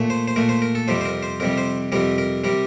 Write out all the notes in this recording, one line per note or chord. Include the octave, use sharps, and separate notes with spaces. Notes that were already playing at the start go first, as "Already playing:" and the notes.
Already playing: A#2 A3
C5
C5
A#2 A3 A#4
C5
A#4
A4
F2 C3 G3 C5
C5
A#4
C5
F2 C3 G3 A#4
C5
F2 C3 G3 A#4
A#4
C3 G3 A#4